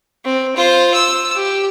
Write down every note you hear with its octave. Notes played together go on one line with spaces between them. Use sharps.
C4
F4 C5
E6
G4